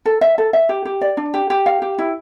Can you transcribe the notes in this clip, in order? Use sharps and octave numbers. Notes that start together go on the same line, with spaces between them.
A4
E5
A4
E5
G4
G4
D5
D4
G4
G4
F5
G4
E4